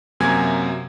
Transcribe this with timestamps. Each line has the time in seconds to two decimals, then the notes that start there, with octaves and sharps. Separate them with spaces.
0.20 F#2 C3 F#3 A#3 G#5 G#6